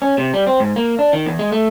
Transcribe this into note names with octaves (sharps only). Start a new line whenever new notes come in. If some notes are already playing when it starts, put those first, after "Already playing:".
C#4
C3
G3
C4
G#2
A#3
D4
D#3
E2
G#3
A3